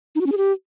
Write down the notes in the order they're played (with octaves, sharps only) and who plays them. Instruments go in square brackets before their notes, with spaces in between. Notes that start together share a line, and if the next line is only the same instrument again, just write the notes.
[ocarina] D#4
F#4
C#4
G#4
G4